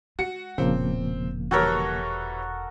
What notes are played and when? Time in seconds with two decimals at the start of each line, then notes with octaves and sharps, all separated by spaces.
0.19 G#3 F#4 C#7
0.58 E1 A#2 C#3 F3 A#3 C4
1.51 E3 G3 F#4 A4 A#4 C#5